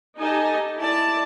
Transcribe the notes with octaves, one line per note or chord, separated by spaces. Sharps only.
D#4 G4 A4 D#5 G#5 A5
E4 D5 A5